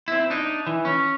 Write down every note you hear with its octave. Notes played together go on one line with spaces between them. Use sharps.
C4 E4
D4 D#4
E3
C#4